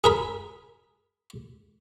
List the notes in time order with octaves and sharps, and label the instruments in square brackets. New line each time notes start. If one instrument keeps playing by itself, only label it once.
[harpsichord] G#4 A#4 B5